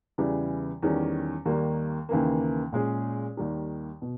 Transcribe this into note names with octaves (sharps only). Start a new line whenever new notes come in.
E2 C#3 E3 G3
E2 D#3 G3 C#4
D#2 D#3 G3 A#3
D#2 C#3 E3 A#3
A#2 G#3 C#4 G#4
D#2 D#3 G3
B2